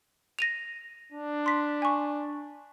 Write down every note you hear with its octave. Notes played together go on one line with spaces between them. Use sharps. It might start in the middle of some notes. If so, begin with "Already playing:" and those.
A#6 D#7 F7
D4
C6 B6
G#5 C#6